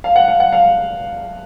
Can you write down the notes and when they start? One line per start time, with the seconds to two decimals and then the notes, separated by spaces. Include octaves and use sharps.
0.04 F5
0.16 F#5
0.28 F5
0.40 F#5
0.53 F5